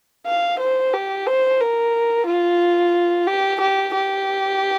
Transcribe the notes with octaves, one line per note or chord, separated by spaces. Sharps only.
F5
C5
G4
C5
A#4
F4
G4
G4
G4